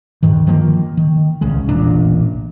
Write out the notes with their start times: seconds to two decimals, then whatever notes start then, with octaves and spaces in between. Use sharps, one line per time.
0.23 D2 G2 D#3
0.47 D#3 F3 A#3
0.97 D#3
1.41 D1 C2 C#3 G#3
1.69 E1 A1 A#2 D4